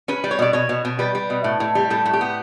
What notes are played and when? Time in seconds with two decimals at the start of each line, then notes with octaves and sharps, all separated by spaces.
0.08 C#4 B4
0.24 G3
0.31 C#5
0.39 B2 D5
0.53 B2 C#5
0.69 B2
0.85 B2
0.99 G3 B4
1.15 G3
1.30 B2
1.44 A2
1.60 A2
1.75 G3
1.90 A2 A4
2.06 A2
2.13 G4
2.21 B3